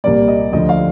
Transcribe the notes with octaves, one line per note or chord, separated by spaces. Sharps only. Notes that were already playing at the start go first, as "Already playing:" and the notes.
C2 A#2 G3 A#3 D5
D#5
D2 D3 F3 D#5
F5